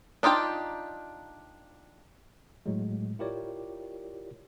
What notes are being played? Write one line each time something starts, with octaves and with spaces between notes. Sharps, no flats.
D4 D#4 F4 G4 G5
A2 F#3 G#3
E4 F4 G4 A#4 C#5 D5